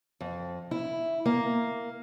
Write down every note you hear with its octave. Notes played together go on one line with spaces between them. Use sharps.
F2
E4
A#3